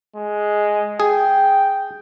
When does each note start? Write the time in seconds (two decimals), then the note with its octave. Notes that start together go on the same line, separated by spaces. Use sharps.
0.16 G#3
1.00 G#4 G5